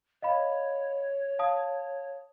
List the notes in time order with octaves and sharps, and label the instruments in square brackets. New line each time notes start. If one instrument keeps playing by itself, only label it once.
[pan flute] C#5 [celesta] D#5 F5 B5
[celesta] F5 A5 D#6